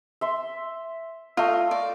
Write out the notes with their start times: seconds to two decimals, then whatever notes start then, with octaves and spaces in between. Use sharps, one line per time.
0.21 E5 C6
1.37 A3 F4 D#5
1.71 D5